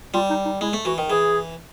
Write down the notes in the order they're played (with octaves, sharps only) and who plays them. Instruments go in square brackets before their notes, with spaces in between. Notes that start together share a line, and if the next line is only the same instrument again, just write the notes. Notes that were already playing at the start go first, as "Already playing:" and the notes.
[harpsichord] G3 [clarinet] F4
[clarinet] D#4
D#4
[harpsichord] G#3 [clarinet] E4
[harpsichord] A3
[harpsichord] E3 [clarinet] F#4
[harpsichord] D#3
[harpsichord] E3 [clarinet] G#4